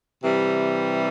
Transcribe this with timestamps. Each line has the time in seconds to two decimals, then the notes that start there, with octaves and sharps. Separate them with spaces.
0.22 C3 E3 G3